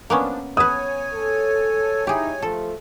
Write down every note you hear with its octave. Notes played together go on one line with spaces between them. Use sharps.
F3 A#3 B3 C#4 D4
B3 B4 C#5 G#5 D#6
A4
D#4 E4 G4 G#4
F3 A3 A4